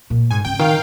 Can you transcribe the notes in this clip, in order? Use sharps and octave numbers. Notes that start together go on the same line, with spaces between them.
A#2
G#2 G#5
C#3 G5
D#3 F5